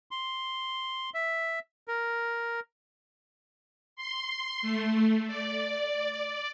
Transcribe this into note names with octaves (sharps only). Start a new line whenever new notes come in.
C6
E5
A#4
C6
A3
D5